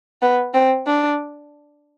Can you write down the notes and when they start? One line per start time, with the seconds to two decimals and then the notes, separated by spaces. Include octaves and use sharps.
0.22 B3
0.54 C4
0.87 D4